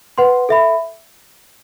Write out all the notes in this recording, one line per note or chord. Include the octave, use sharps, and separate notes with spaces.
B4 F#5 C6
A4 E5 B5